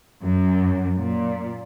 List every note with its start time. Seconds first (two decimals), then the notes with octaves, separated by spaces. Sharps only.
0.23 F#2
0.99 A#2